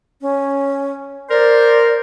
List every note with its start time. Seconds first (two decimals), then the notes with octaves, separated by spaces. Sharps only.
0.21 C#4
1.30 A#4 C5 D5